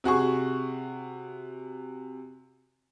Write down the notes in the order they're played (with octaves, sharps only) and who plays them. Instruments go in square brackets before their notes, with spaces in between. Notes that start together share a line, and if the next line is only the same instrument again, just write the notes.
[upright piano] C3 F#4 G#4 C#6